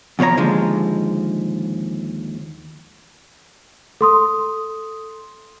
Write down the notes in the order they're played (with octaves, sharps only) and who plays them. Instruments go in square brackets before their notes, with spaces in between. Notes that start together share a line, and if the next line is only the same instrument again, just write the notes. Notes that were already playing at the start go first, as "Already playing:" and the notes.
[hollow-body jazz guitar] E2 B2 F3 C#5 A#5
D#2 D3 F3 G#3
[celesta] A4 C6 D#6